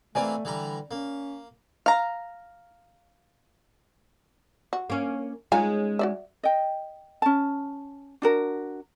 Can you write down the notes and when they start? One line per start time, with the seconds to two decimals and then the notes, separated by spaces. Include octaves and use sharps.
0.15 E3 A3 A#3 C4 D5 G#5
0.45 D3 E3 G3 A#5
0.91 A#3 C#4
1.86 F5 A#5
4.73 F#4
4.90 A#3 C#4
5.52 G#3 C#4 D#4 F4 G#5 A#5
5.99 F#4 D5 E5
6.43 D#5 G5
7.22 C#4 A5
8.22 D4 F#4 A#4